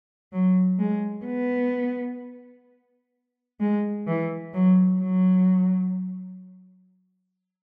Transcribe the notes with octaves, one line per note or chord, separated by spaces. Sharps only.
F#3
G#3
B3
G#3
E3
F#3
F#3